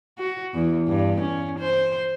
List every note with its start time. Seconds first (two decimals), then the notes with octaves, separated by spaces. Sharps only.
0.19 F#4
0.54 E2
0.88 G2
1.21 C#4
1.59 C5